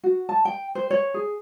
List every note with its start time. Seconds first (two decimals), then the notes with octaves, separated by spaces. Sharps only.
0.03 F#4
0.29 A5
0.45 G5
0.75 C5
0.91 C#5
1.14 G#4